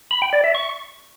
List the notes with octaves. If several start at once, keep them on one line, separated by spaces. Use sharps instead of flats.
B5
G5
D5
E5
C#6